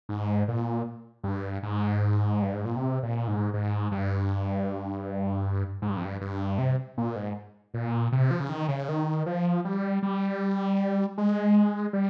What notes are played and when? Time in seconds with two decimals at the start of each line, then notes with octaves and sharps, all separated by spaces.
0.09 G#2
0.48 A#2
1.24 G2
1.63 G#2
2.42 G2
2.53 G#2
2.65 A#2
2.76 C3
3.03 A#2
3.28 G#2
3.54 G#2
3.92 G2
5.82 G#2
5.90 G2
5.97 F2
6.05 G2
6.21 G2
6.58 C3
6.98 A#2
7.16 G#2
7.74 A#2
8.12 C3
8.31 F3
8.40 C#3
8.49 D#3
8.68 C#3
8.89 D#3
9.26 F3
9.65 G3
10.03 G3
11.18 G#3
11.93 G3